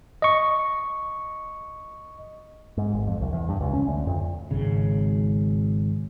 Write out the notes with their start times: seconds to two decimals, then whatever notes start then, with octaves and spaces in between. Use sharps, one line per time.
0.22 D#5 C#6
2.77 G#2
2.94 G#1
3.08 F2
3.21 C2
3.33 E2
3.49 G2
3.61 C#2
3.73 C#4
3.88 D2
4.07 F2
4.51 G#1 C#3